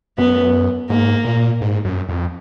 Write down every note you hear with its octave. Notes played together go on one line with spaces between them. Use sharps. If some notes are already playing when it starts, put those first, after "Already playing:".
F#2 B3
G#2 A#3
A#2
G#2
F#2
F2